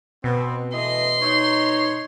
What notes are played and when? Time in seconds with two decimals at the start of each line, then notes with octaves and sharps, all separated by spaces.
0.24 B2 B3 C4
0.74 E3 A3 D#5 C6
1.22 D#4 C#5